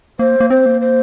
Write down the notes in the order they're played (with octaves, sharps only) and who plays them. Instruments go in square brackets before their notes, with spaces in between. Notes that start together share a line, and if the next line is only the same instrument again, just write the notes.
[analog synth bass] A#3 [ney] C5
[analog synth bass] A#3
[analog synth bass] C4 [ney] C5
[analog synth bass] A#3
[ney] C5